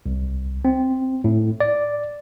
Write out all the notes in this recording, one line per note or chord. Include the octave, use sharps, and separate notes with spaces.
C2
C4
A2
D5